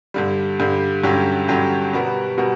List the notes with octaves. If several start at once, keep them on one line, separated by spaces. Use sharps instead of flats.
G2 D3 G3
G2 D3 G3
G2 D3 F#3 C#4 G4
G2 D3 F#3 C#4 G4
B2 G3 B3 F#4 A#4
B2 G3 B3 F#4 A#4